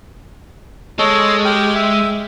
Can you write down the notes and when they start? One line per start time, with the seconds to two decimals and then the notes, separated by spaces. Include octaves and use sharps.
0.99 G#3 A4 C#5 D#5
1.45 G4 G5 F6
1.75 E5